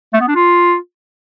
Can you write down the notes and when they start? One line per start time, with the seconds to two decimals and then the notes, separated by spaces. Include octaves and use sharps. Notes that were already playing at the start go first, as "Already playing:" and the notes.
0.13 A3
0.21 B3
0.28 D4
0.35 F4